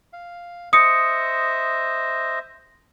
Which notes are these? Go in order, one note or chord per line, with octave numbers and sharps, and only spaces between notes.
F5
C5 D#5 E5 D#6 C#7